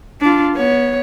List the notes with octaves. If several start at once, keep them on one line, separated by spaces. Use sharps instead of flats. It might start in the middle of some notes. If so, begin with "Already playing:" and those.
D4 F4
B3 C#5